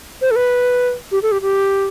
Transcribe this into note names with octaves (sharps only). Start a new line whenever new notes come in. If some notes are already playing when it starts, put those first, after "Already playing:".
C5
A4
B4
G4
A4
G4
G4